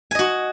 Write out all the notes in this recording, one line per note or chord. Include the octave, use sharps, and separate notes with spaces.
F#4 D#5 G#5